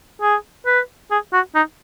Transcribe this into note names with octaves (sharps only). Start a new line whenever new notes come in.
G#4
B4
G#4
F#4
D#4